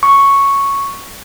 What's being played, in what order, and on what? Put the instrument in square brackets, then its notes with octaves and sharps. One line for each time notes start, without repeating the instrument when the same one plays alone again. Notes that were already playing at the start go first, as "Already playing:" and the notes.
[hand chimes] C#6